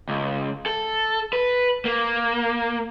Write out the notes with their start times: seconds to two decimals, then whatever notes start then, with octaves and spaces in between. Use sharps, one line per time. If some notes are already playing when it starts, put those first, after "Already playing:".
0.09 C#2
0.66 A4
1.33 B4
1.85 A#3